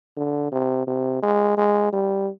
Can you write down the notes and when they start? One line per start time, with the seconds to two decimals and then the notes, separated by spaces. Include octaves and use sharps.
0.17 D3
0.52 C3
0.87 C3
1.22 G#3
1.57 G#3
1.92 G3